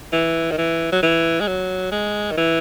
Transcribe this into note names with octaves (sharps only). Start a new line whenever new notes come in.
E3
D#3
E3
F#3
E3
G#3
F#3
G#3
D#3
E3